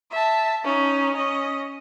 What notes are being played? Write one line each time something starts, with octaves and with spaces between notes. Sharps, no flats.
E5 A5
C#4 D#4
C#4 D#5